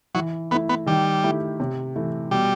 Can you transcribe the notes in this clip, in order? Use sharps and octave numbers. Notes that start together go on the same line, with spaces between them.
E3 F#3
A3 B3 E4
B3
D#3 G3
A3 E4 G4
C3
E3 A3
B2 G3